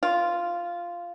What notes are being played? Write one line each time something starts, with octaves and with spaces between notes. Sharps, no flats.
F4